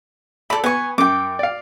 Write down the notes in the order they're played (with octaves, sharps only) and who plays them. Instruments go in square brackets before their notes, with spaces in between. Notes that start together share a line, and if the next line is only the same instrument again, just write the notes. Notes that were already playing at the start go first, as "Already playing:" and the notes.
[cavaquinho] A4 D5 [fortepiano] B5
[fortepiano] B3 [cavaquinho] G#5 C#6
[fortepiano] F#2 [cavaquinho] G5 D6
[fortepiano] D5 F5